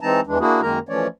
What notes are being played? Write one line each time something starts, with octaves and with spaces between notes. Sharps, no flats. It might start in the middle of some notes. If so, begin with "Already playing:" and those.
E3 G#3 C4 D#4 A5 A#5
E2 E3 G#3 D4
A#3 D4 E4 F#4 G#4
F#2 D#3 G#3 A#3 A#4 A#5
E3 F3 A3 C#4 C#5 D5